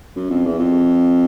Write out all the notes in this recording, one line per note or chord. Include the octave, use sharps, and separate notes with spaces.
F#2
F2
E2
F2